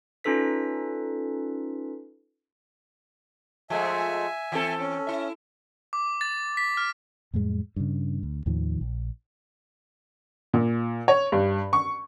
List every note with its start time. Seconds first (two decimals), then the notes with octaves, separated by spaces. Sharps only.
0.24 C#4 D#4 F4 A4 B4 B6
3.70 F3 G#3 A3 E5 G#5
4.52 E3 C4 A4
4.80 C#4
5.07 E4 E5
5.93 D6
6.21 A6
6.57 B6
6.77 F6
7.34 F2 A2 G3 G#3
7.76 G2 C#3
8.23 D2
8.46 D#2 A2 D#3 F3
8.81 A#1
10.54 A#2
11.08 C#5
11.32 G2
11.73 C#6